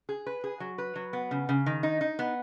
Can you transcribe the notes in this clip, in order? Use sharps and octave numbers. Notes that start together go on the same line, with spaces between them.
G#4
B4
G#4
F#3
B4
F#3
B3
C#3
C#3
D#3
D#4
D#4
B3